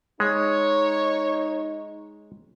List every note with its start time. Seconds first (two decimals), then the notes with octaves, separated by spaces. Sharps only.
0.20 G#3 D#4 C#5